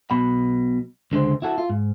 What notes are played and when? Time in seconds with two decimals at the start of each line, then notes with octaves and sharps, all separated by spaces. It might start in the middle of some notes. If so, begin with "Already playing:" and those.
0.11 B1 B2 B5
1.12 C#2 D3 G#3 C5
1.42 E4 F#4 A4
1.58 F4
1.70 G#2